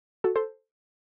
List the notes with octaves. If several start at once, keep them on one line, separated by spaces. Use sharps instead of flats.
F#4 A4
A4 C5